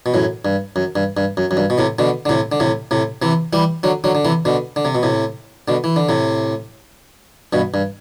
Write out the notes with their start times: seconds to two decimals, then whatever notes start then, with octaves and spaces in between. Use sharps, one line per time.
0.06 B2
0.14 F#2 A2
0.45 G2
0.76 F#2
0.96 G2
1.17 G2
1.37 F#2
1.51 F#2
1.57 G2
1.70 B2
1.78 A2 C3
1.99 B2 D3
2.25 D3
2.29 A2 C3
2.52 D3
2.60 A2 C3
2.91 A2 C3
3.22 C3 E3
3.53 E3 G3
3.83 D3 F#3
4.04 D3 F#3
4.15 D3
4.25 C3 E3
4.45 B2 D3
4.76 D3
4.85 C3
4.95 B2
5.03 A2 C3
5.68 B2 D3
5.84 E3
5.96 D3
6.09 A2 C3
7.53 G2 B2
7.74 G2